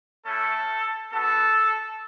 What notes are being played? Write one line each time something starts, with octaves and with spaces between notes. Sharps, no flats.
A3 C#4 E4 A4
B3 F#4 A4